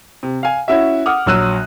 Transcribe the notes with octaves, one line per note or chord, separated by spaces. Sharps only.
C3
F5 G#5
C#4 E4 F#4 E5
F#5 D6 D#6 F6
A#1 F#3 E6 F#6 D#7